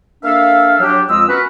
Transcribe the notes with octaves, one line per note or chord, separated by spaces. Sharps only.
A#3 D4 A4 E5 F5
F#3 D4 G4
F2 G#3 F4 D#5 E6
B3 C#4 F#4 A#4 B4